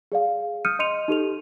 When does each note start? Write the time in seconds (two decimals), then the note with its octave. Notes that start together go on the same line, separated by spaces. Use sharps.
0.12 G#4 D5 F5
0.65 D#6 F6 G6 C#7 D#7
0.79 D#5 C6 C#7 D#7 F7
1.08 D#4 G4 A4 F7